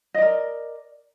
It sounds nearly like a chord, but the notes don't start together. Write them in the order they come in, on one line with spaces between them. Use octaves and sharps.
D#5 D5 A#4